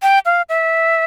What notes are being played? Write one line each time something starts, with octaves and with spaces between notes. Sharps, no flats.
G5
F5
E5